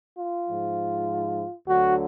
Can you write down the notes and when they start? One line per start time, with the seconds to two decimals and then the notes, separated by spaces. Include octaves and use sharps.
0.17 F4
0.48 G#2 F3
1.67 D2 D3 F#3 F#4